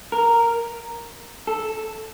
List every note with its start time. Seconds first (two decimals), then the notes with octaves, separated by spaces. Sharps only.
0.12 A#4
1.47 A4